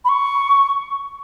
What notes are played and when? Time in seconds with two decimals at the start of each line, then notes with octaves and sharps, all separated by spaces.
0.05 B5
0.09 C#6